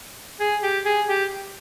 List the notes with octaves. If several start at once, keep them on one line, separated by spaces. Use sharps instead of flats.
G#4
G4
G#4
G4